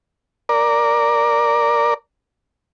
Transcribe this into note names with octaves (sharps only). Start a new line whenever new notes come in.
A#4 D5